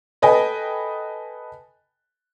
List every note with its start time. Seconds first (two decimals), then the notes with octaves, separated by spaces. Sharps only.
0.22 A4 B4 D#5 G5 G#5